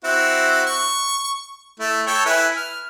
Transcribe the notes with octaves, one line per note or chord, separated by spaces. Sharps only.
C4 E4 F#4
C#6
A3 E4
A4 C#5 G5
E4 B4 G#5
F6